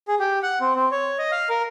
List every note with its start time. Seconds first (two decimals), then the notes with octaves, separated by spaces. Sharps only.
0.08 G#4
0.20 G4
0.43 F#5
0.60 C4
0.76 C4
0.91 C#5
1.19 D#5
1.32 F5
1.49 A#4